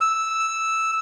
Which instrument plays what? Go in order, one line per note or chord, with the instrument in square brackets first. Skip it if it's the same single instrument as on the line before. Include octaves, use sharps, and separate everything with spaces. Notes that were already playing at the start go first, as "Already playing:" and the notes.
[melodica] E6